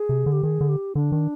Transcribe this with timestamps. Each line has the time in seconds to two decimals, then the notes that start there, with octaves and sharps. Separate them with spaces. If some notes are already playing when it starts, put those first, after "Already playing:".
Already playing: G#4
0.09 C3
0.26 D3
0.32 G4
0.43 D#3 G#4
0.61 D3
0.69 G4
0.95 D3 D4
1.12 D#3